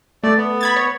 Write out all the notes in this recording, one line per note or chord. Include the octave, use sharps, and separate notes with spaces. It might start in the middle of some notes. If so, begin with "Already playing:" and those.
A3 D5
B3
B5 G#6 A6
C#5